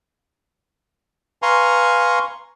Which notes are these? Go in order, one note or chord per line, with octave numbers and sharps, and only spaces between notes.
B4 F5 G#5 A#5 C6 C#6